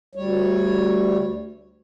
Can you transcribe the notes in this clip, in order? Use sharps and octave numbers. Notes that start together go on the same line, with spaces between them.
D2 G3 C#5